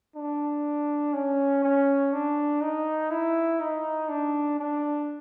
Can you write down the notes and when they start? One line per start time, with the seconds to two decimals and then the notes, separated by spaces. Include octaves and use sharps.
0.16 D4
1.14 C#4
1.64 C#4
2.13 D4
2.62 D#4
3.11 E4
3.60 D#4
4.09 D4
4.59 D4